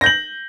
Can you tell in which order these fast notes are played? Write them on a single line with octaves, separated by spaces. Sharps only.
A#6 G6 F#7